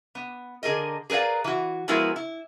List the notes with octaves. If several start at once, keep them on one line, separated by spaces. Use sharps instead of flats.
B3
D3 G#4 A#4 D#5
G#4 A#4 B4 D5 F5
E3 F#4
F3 G#3 B3 E4 F#4 A#4
E4